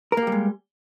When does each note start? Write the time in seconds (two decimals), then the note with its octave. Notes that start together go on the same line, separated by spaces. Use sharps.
0.12 A#4
0.17 A#3
0.22 G4
0.27 G3
0.32 G#3